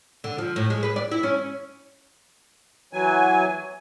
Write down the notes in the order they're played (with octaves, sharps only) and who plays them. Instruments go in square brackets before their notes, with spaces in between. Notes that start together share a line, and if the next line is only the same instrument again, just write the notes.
[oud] D3
F3
A2
G#3
B4
D5
E4
C#4
[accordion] E3 F#3 G#5